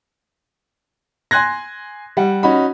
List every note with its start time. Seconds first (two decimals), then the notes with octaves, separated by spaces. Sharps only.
1.31 G#5 C6 F#6 G#6 A#6
2.17 G3 F#5
2.43 C#4 D#4 F#4 B5